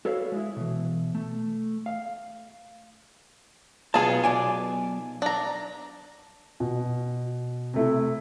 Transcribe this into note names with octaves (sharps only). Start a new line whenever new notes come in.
F#4 A4 B4 C#5 F5
G#3 E4
B2 E3
A3
F5
B1 B3 F4 G#4 A5
B1 D5 G#5
D4 A#5
B2
C3 A3 E4